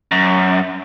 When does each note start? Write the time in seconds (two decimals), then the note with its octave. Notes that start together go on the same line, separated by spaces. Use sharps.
0.12 F#2